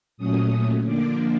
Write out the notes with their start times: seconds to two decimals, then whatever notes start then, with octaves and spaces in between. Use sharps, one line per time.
0.17 A#2 F#3 A3 C#4 D#6
0.83 D3 F3 A#3 D4 D6